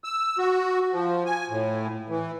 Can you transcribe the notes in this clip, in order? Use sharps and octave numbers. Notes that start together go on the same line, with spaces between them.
E6
F#4
F3
G#5
A2
E3